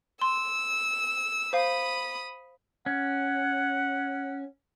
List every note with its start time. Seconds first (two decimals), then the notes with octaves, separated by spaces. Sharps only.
0.22 C6 E6
1.53 C5 F5 B5 D#6
2.86 C#4 F#5